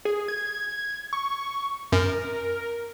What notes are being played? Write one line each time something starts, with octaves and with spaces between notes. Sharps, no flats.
G#4
G#6
C#6
F#2 A#4